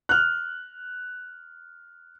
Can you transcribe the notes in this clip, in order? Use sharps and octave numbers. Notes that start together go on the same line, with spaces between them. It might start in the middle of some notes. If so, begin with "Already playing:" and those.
F6 F#6